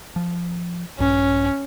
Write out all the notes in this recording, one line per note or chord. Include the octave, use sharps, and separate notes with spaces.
F3
A#1 G2 C#4